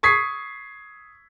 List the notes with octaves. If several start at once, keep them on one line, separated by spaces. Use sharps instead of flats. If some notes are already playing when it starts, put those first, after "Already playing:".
C#6 D#6 G#6 B6 C7